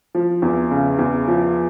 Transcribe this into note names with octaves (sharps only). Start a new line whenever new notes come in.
F3
E2
C#3
E2
F3